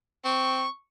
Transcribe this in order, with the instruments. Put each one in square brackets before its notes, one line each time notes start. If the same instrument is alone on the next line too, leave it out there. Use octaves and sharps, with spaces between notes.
[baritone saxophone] C4 [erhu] C#6